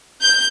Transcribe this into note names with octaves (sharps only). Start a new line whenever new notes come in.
G6